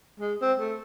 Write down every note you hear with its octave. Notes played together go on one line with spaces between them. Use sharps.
G#3
C4
A3